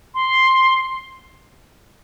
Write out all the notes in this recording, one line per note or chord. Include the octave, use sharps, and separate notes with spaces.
C6